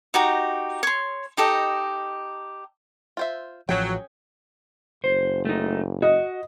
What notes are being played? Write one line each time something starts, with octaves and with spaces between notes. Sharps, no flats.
D#4 F#4 G4 A#5
C#5 C6
D#4 G4 A4 D#5
F4 C5 E5
A1 F3 F#3 C#4 G#4 G5
F#1 C5
A3 D#4
F#4 D#5